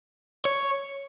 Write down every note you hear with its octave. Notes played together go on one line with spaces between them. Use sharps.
C#5